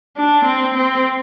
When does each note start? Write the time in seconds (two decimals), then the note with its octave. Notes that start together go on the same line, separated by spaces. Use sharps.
0.17 D4
0.45 C4
0.74 C4